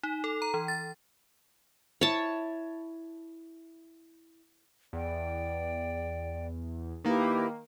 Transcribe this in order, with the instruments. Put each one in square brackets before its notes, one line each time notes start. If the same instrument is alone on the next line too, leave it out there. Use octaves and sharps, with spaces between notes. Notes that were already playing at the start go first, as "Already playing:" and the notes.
[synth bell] D#4
A4
A#5
E3
A6
[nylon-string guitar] E4 [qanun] C#5 A5
[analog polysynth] E2 [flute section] D5 G5
[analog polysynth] D#3 A#3 [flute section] E4 G4 B4